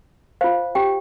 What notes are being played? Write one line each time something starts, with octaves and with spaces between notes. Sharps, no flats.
F4 C5 F5
G4 G5